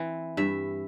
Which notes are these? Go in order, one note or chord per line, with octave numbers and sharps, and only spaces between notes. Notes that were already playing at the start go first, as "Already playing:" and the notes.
Already playing: E3 C4
G2 E5